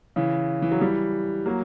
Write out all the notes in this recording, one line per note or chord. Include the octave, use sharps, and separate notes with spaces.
C#3 E3
E3
F#3
E3 G3
F#3 A#3